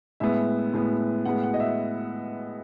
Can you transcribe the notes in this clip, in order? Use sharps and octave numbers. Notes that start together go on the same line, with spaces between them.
A2 G#3 B3 E5
A2 G#3 B3
A2 G#3 B3 F#5
F#5
D#5
E5